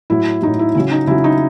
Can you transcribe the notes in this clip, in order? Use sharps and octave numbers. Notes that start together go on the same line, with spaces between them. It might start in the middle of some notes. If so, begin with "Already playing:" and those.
A2 F#3 E4
A2 F#3 D#4
E4
C#3 F#3 E4
D#4
C#3 F#3 E4
D#4